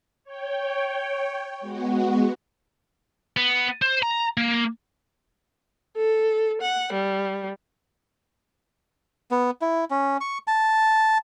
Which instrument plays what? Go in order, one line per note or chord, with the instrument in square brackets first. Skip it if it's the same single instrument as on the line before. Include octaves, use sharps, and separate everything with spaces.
[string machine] C#5 G5
G#3 B3 F#4
[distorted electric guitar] B3
C5
A#5
A#3
[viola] A4
F#5
G3
[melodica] B3
E4
C#4
C#6
A5